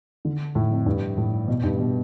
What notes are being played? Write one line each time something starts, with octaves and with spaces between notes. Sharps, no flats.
D3
A2
F2
G2
A2
B2
G2
B2